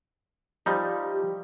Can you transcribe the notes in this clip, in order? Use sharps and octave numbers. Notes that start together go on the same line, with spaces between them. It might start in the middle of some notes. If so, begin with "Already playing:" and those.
F3 G3 D#4 G4